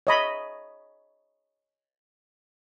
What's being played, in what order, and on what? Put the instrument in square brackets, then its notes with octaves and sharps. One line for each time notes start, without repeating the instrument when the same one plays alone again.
[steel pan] C#5 D#5 B5